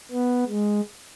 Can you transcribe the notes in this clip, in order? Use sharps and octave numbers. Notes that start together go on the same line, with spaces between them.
B3
G#3